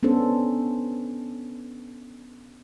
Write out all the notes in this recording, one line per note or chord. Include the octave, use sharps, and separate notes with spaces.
B3 C#4 D4 A4 C5